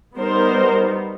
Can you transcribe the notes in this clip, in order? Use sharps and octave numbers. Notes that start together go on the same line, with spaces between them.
G3 B3 D#4 A#4 C5